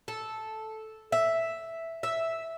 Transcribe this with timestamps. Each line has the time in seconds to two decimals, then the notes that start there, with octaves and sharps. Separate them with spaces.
0.08 A4
1.12 E5
2.03 E5